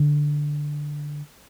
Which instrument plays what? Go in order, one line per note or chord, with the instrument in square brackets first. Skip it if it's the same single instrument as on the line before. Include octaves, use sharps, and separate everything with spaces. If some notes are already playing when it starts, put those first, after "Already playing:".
Already playing: [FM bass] D3